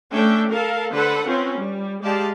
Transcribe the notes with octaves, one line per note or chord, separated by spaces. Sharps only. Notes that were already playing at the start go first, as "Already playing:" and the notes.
A3 C#4 D4 E5 G5
A4 A#4 F5 A5
D3 A4 B4 C5 F#5
C4 C#4 F4 B4
G3
G#3 G4 D5 F5 A5